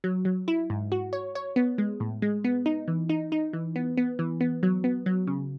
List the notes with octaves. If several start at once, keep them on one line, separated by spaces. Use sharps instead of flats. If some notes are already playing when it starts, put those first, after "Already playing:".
F#3
F#3
E4
G#2
F#4
C#5
C#5
B3
G#3
A2
G#3
B3
D#4
E3
D#4
D#4
E3
B3
B3
E3
B3
F#3
B3
F#3
C#3